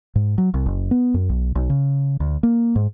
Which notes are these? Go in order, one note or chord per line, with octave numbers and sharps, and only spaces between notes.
G#2
F#3
C2
F#1
B3
F#2
B1
B1
C#3
D2
A#3
G#2